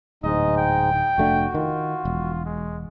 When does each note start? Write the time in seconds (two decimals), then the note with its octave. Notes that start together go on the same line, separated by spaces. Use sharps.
0.24 D1 G#2 G#3 D#4 D#5
0.58 G5
1.18 F1 A3 D4 F#4
1.54 D#3 F4
2.05 E1
2.46 G#3